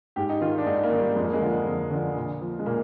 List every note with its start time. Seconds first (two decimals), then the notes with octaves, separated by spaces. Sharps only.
0.16 G#2 G4
0.29 D#4
0.41 D#3 F4
0.58 D4
0.66 G#2 D#4
0.83 A#3
0.91 D#3
0.99 G3
1.16 F2 G#3
1.25 A#3
1.33 G#3
1.41 D3 F3
1.66 F2
1.91 D3 F3
2.16 A#2
2.41 F3
2.59 G#3
2.66 A#2 A#3